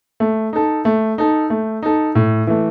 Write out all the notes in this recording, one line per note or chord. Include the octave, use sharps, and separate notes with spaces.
A3
D#4 A4
A3
D#4 A4
A3
D#4 A4
A2
E3 A3